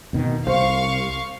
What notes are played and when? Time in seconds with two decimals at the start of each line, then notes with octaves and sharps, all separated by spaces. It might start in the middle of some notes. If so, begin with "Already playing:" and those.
0.13 F1 B2 D#3
0.47 C2 C5 F5 C#6